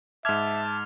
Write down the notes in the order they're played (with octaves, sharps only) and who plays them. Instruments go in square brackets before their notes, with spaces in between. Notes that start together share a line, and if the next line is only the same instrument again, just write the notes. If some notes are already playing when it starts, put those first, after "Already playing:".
[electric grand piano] G#2 G#6 [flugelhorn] E5 [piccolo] A5 [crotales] D6 F6 F7